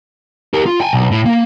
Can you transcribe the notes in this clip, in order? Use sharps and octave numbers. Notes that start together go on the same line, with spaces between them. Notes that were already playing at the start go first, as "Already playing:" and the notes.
G4 A#4
F4
G5 G#5
B1
A2
A#3